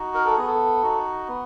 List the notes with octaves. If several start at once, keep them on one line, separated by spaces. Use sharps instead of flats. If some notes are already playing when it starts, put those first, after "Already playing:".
Already playing: D#4 F#4
A#4
A4
B3 G#4
A4
D#4 F#4
B3